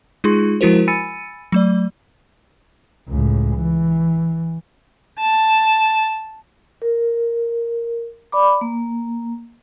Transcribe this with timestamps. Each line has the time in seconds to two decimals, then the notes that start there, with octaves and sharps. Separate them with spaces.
0.24 G#3 D#4 F4 G#4 C6 C#6
0.61 F3 G#3 E4 F#4 A#4 C5
0.88 G#5 B5 E6 A6 C#7 D#7
1.52 F#3 A3 D5
3.09 C#2 A2
3.56 E3
5.20 A5
6.82 A#4
8.32 D5 B5 D6
8.61 A#3